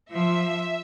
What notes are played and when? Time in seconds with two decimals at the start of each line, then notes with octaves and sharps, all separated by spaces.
0.11 F3 E5